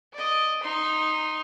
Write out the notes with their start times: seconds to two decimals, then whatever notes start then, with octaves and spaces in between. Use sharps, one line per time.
0.13 D5 D#5
0.62 D#4 C6